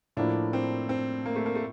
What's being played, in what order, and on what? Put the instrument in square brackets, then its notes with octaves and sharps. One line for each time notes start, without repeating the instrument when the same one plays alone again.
[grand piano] A2 F3 A#3 E4 [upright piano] D4
[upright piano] C4
C4
A#3
A3
A#3
A3